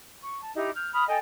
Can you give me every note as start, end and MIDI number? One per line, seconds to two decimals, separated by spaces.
0.23 0.41 85
0.41 0.53 81
0.55 0.69 63
0.55 0.69 64
0.55 0.69 67
0.74 0.92 89
0.74 0.92 91
0.93 1.03 83
0.93 1.03 87
0.93 1.03 89
1.07 1.17 69
1.07 1.17 75
1.07 1.17 79
1.07 1.17 80